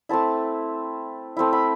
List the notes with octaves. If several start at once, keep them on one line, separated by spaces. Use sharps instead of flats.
A3 C4 E4 A5
A3 C4 E4
B5